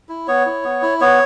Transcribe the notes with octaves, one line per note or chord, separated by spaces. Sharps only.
E4
B3 C#5
E4
B3
E4
B3 C#5